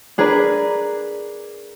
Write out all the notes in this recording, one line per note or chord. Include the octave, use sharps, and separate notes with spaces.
D4 G#4 A#4 B4 D5